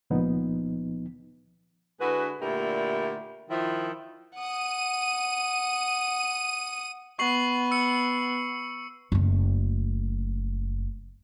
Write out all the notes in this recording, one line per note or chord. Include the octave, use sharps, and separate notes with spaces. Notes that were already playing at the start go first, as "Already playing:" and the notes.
C#2 A#2 F3 B3 D#4
D3 G#3 E4 F#4 B4
A#2 D3 A3 E4 G4 A#4
D#3 F3 E4
F#5 D#6 D#7
B3 C#6 C7 F#7
E6 C#7
F#1 A3